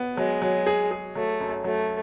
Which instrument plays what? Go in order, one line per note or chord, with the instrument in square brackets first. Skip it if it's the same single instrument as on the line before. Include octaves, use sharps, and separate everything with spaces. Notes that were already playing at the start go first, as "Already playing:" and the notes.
Already playing: [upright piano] B3
[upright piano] F#3 [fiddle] G#3
[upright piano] F#3
G#4
G#4
[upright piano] F#3 [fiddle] A3
[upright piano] F#2
[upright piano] F#3 [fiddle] A3